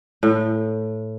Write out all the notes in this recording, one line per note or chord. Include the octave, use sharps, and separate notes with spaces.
A2